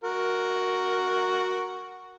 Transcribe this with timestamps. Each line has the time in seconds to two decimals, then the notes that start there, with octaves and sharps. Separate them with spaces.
0.04 F#4 A#4